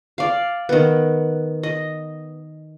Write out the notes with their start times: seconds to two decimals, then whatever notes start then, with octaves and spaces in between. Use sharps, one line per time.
0.18 D5 F5
0.69 D#3 B3
1.63 D#5